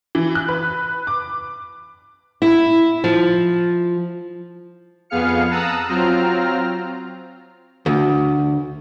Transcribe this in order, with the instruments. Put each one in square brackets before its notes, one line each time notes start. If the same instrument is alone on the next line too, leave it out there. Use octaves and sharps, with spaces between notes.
[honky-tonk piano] E3
F#6
B4
D6
[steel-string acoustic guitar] E4
F3
[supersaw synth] F2 B3 G#4 F5 F6 C#7
A5 A#5 D#6 E6 F#6
F#3 C4 F4 A#5 F6
[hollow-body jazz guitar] D2